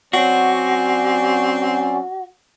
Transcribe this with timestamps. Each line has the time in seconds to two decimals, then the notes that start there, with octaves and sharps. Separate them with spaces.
0.13 F#3 C4 C#4 F#4 D5